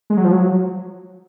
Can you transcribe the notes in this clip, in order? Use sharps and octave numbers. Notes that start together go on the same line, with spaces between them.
G#3
F#3
F3
F#3